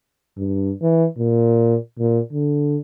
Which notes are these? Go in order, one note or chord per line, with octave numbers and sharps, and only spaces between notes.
G2
E3
A#2
A#2
D3